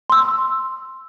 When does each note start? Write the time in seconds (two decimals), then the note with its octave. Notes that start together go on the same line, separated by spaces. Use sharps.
0.10 C6 E6